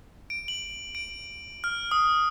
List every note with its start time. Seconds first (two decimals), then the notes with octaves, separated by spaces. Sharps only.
0.30 D7
0.48 F#7
0.95 D7
1.64 F6
1.91 D#6